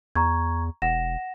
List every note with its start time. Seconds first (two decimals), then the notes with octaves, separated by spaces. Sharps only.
0.15 E2 A#5 C#6 G#6
0.82 E1 F#5 A#6 E7